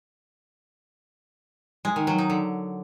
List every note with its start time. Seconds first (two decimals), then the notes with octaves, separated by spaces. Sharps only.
1.85 G#3
1.96 D#3
2.07 F#3
2.18 D#4
2.30 D3